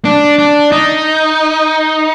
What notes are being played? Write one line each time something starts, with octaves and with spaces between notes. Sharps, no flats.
D4
D4
D#4